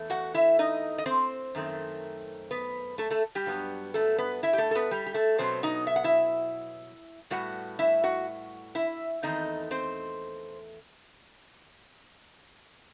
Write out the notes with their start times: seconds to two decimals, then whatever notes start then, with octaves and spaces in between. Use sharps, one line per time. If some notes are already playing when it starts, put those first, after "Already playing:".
Already playing: E2 A3
0.10 F#4 F#5
0.34 E4 E5
0.59 D#4 D#5
0.98 D#5
1.06 C4 C5
1.55 F#2 D#3 A3 C4
2.51 B3 B4
2.98 A3 A4
3.10 A3 A4
3.35 G3 G4
3.46 G2 F#3 B3
3.94 A3 A4
4.18 B3 B4
4.43 E4 E5
4.53 G4
4.58 A3 A4
4.71 A4
4.75 B3 B4
4.91 G3 G4
5.06 G4
5.14 A3 A4
5.38 B2 F#3 B3 C4 C5
5.63 D#4 D#5
5.87 E5
5.96 F#5
6.04 E4 E5
7.30 A2 G3 B3 F#4 F#5
7.79 E4 E5
8.04 F#4 F#5
8.75 E4 E5
9.23 E2 D#3 A3 C4 D#4 D#5
9.71 C4 C5